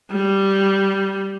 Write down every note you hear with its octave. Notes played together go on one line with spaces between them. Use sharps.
G3